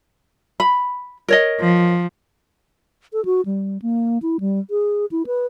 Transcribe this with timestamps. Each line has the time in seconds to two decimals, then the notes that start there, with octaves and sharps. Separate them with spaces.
0.60 B5
1.28 A#4 C#5 D#5
1.60 F3
3.13 A4
3.25 F#4
3.46 G3
3.82 A#3
4.22 E4
4.40 G3
4.70 G#4
5.12 E4
5.26 B4